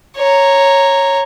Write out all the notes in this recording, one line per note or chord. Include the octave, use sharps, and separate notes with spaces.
C#5 A#5